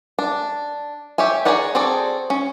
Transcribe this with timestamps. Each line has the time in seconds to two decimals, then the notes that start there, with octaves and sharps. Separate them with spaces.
0.19 D4
1.18 G4 C#5 E5 G#5
1.45 G#4 A#4 C#5 D5 F#5
1.75 C4 F#4 G#4 A4 D5
2.30 C#4